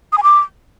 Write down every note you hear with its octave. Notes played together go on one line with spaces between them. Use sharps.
D#6
G#5
D6